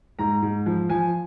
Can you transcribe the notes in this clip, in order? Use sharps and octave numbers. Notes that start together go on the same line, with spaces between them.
G#2 A#5
G#2
F3
F3 G#5